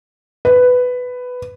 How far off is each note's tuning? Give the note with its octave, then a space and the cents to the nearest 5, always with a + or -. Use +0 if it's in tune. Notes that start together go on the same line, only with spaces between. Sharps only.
B4 +10